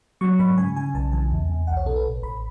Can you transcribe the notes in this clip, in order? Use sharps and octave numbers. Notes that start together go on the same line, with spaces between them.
F#3 C#6
G#2 B5
C#3 G#5
C#3 G#5
B1 A5
E3 G#5
E2
E2
B1 F#5
C#5
B2 A4
B4
A1
A1 B5